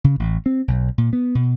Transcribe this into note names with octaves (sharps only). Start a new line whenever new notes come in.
C#3
A1
C4
B1
A#2
B3
B2